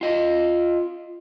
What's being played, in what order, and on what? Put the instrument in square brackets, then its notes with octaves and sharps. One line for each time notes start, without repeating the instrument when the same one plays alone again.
[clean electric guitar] F4 D#5